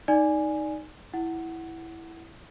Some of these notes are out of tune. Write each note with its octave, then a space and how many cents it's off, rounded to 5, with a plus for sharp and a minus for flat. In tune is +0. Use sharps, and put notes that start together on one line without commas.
D#4 +0 D5 +0 G#5 +0
E4 +0 F#5 +5